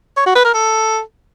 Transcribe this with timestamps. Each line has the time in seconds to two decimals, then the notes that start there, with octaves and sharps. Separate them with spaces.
0.17 C#5
0.26 F#4
0.35 B4
0.45 A#4
0.54 A4